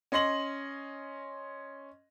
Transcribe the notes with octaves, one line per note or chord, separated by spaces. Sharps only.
C#4 D#5 C6 A#6 F#7